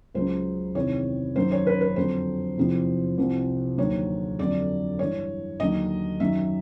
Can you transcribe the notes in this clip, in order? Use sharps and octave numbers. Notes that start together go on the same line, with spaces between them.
C#2 C#3 F#3 C5
E2 C3 D#3 C#5
F#2 D#3 F#3 C5
C#5
B4
B4
F2 D3 F#3 C5
E2 C3 F3
C2 C3 F3
D#2 D3 F#3 C#5
F2 D3 F#3 D5
G2 E3 C#5
D#2 D3 F#3 D#5
F#2 D#3 F#3 E5